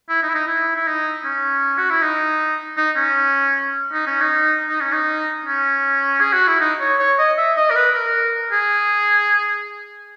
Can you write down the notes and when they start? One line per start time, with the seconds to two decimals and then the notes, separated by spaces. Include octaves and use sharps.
0.09 E4
0.23 D#4
0.29 E4
0.35 D#4
0.48 E4
0.76 E4
0.87 D#4
1.25 C#4
1.78 F#4
1.90 E4
2.02 D#4
2.77 D#4
2.96 C#4
3.93 D#4
4.07 C#4
4.21 D#4
4.69 D#4
4.81 C#4
4.93 D#4
5.45 C#4
6.20 G#4
6.33 F#4
6.47 E4
6.60 D#4
6.80 C#5
6.99 C#5
7.19 D#5
7.38 E5
7.57 D#5
7.71 A#4
7.75 B4
7.95 A#4
8.52 G#4